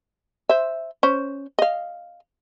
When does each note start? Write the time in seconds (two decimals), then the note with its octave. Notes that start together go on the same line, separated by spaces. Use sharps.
0.49 C5 E5
1.03 C#4 C5
1.59 D#5 F5